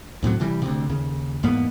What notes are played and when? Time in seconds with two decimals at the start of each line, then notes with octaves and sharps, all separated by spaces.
0.23 D#2 A2 C3 F#3
0.40 C3 E3 G3
0.62 D2 C3
0.90 D#2 C#3
1.43 E2 G#2 A#3 B3